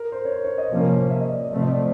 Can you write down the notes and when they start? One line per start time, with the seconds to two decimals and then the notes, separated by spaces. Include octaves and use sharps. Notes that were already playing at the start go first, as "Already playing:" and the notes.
Already playing: A#4
0.12 C5
0.25 C#5
0.32 C5
0.44 C#5
0.58 D#5
0.71 C3 F3 A#3 C#4
1.11 E5
1.21 D#5
1.30 D5
1.39 D#5
1.50 C3 F3 A3 C4 E5
1.60 D#5
1.71 D5